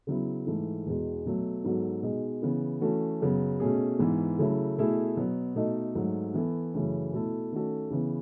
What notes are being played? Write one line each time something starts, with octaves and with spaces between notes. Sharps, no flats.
C#3 F#3 B3 E4
G#2 E3 A3
E2 B2 G#3
B2 F#3 A3
G#2 F#3 B3 F#4 A4
B2 G#3 D#4 G#4
C#3 E3 B3
E3 A3 C#4 F#4 A4
F#2 C#3 F#3 B3
B2 A3 C#4 G#4
G#2 E3 B3
C#3 F#3 A3 E4
B2 A3 E4 G#4
B2 F#3 B3
B2 A3 D#4 A4
G#2 F#3 A3
E3 B3 E4 A4
F#2 C#3 E3 A3 C#4
B2 A3 E4 A4
D#3 A3 C#4 F#4 A4
C#3 E3 B3